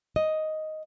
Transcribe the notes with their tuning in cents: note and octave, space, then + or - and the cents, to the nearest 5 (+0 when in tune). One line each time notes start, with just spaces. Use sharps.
D#5 +5